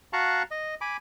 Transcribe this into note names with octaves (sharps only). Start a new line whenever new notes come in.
F#4 F5 A5 A#5 C#6 F#6
D#5
G#5 B5 D6